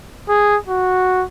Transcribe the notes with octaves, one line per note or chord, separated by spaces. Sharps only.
G#4
F#4